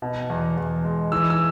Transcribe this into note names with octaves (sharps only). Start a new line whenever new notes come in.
B2
E2
E2
G#3
E3 E6
E6